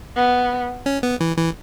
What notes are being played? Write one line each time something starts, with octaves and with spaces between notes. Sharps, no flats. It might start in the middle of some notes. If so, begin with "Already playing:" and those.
B3
C#4
B3
E3
E3